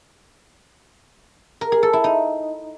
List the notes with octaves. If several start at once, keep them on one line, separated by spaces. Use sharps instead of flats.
A#4
G#4
A4
E4
D#4